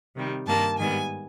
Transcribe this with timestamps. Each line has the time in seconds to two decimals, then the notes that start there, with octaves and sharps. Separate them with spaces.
0.15 C3 D#3 G3
0.46 G2 D#3 G3 A#3 A5
0.78 G#2 D#3 G3 B3 G#5